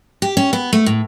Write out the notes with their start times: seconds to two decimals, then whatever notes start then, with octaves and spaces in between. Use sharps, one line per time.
0.22 G4
0.37 C#4
0.53 B3
0.73 A3
0.86 A2